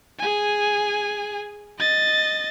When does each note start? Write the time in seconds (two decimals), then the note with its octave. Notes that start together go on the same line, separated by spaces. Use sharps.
0.19 G#4 G#5
1.79 D#5 A6